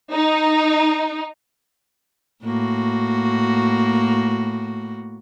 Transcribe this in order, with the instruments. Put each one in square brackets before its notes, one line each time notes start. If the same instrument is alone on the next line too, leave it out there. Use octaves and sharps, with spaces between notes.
[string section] D#4
[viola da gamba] A2 A#3 F#4